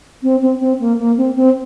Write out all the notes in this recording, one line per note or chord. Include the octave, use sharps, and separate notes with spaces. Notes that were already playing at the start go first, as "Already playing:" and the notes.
C4
C4
C4
A#3
A#3
C4
C4